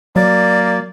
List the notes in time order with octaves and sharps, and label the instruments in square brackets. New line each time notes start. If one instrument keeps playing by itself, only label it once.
[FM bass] F#3 [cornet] A#3 [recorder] D5